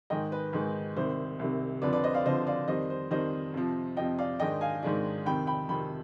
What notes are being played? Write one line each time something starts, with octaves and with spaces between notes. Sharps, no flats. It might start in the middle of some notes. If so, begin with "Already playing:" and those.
G#2 D#3 G#3 D#5 G5
B4
G#2 D#3 G#3
C2 C3 D#3 C5
C2 C3 D#3
F2 D3 F3 B4 D5
B4 D5
C5 D#5
D5 F5
F2 D3 F3 C5 D#5
D5 F5
F2 D#3 G3 C5 D#5
C5
F2 D#3 G3 C5 D#5
F2 C3 F3
F2 C3 F3 D#5 G5
D5 F5
G#2 D#3 G#3 D4 D#5 G5
F5 G#5
G#2 D#3 G#3 D4
F2 C3 D#3 G5 B5
G5 B5
F2 C3 D#3 G5 B5